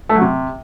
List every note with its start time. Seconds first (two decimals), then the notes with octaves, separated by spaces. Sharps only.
0.09 A3
0.16 F#3
0.22 C3